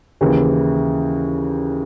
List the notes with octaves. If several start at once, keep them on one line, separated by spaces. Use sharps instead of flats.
D#2 C#3 E3